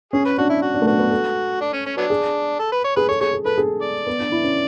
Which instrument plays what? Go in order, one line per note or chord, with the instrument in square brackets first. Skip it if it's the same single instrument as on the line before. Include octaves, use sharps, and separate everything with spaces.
[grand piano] C#4 [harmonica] G#4
[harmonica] B4
[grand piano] D4 [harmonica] F#4
[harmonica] E4
F#4
[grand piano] D4
A3
[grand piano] B3 [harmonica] F#4
[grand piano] B3
A4
[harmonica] D4
C#4
C#4
F#3 B3 D4
[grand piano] G#4
[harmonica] A4
B4
C#5
[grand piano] G#4 [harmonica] B4
[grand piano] A4 [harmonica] C#5
[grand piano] G#4 [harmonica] C#5
[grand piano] G#4
[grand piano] A4 [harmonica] B4
[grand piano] G#4
[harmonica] D5
[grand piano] B3
D4
E4
C#4